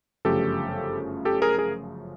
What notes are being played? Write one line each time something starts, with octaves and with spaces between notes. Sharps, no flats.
G1 F#2 C#3 F3 A3 G4 A4
G4 A4
G#4 A#4
G#4 A#4